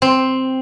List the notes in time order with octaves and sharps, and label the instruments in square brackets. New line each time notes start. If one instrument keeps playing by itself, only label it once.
[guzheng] C4